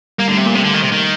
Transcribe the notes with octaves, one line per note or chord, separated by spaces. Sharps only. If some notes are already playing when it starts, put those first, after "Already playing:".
G3 A#3
D3 A3
C3
A#2 A#3
C3
D3
D#3
C3
D#3